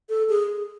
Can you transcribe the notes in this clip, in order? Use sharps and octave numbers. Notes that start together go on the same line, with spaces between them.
A4
G#4